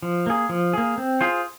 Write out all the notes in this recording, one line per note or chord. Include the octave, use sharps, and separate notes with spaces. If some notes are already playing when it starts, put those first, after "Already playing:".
F3
A#3 G#4
F3
A#3 G#4
C4
F4 G#4 C5